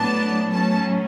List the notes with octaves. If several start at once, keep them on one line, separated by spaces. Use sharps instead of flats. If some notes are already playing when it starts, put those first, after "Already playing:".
Already playing: A2 F#3 B3 D4 A5
A2 F#3 C#4 A5